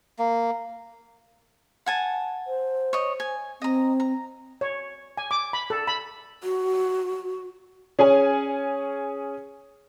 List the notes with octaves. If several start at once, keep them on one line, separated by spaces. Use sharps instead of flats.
A#3
F#5 G#5 A5
C5
C#5 D#5
G#5
C4 D#5 A#5
A#5
C#5
G#5
D6
B5
A4
B5
F#4
C#4 G#4 C#5 G#5